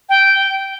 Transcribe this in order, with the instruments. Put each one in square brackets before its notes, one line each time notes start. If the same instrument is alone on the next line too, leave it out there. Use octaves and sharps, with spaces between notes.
[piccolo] G5